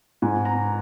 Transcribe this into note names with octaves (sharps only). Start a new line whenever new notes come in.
G#2 G#5
A#5